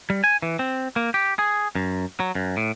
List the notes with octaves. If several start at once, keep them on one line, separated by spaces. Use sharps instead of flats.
G3
G#5
E3
C4
A#3
G4
G#4
F#2
F#3
F#2
A2